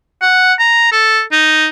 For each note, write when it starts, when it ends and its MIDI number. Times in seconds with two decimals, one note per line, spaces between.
0.22 0.53 78
0.59 0.87 82
0.92 1.22 69
1.32 1.67 63